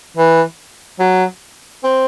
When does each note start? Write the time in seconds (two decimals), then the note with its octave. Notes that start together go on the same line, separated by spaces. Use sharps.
0.17 E3
0.99 F#3
1.83 C4